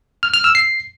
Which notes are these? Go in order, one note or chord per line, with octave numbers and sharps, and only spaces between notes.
F6
F6
E6
C7